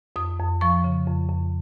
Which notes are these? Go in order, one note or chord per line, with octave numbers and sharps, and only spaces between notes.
F2 D#6
F2
F3 C#6
C#3
F2
F2